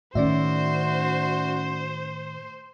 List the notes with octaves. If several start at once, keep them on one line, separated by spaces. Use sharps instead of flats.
A2 D#3 C#4 F#4 C5 D5 E5